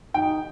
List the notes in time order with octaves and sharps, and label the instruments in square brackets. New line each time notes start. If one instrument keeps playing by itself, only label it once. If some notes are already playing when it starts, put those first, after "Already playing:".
[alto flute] D#4 [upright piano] G5